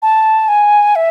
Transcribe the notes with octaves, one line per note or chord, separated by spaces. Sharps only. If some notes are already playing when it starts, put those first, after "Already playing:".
A5
G#5
E5